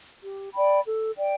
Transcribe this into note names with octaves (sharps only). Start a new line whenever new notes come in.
G4
D5 G5 B5
A4
D5 G5